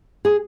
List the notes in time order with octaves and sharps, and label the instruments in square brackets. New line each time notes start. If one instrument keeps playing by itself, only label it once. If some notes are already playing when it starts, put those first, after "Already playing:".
[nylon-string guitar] G#4